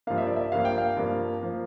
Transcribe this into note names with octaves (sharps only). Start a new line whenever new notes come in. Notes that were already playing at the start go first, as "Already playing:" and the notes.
G2 F3 A#3 F5
E5
D5
E5
G2 F3 A#3 F5
G5
F5
G2 F3 A#3
F3 A#3